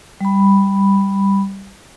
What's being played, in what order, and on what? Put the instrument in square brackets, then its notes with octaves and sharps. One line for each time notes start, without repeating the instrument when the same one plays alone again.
[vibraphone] G3 B5